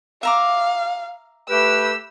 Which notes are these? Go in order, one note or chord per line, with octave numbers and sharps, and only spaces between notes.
E5 F5 A#5 D6
A3 G4 B4 E6